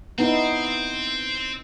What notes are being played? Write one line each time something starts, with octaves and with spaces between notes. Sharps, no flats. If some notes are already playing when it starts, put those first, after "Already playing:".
B3 C4 D#4 E4